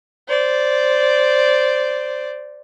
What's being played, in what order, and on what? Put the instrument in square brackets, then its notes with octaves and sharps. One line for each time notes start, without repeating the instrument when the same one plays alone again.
[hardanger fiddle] C5 D5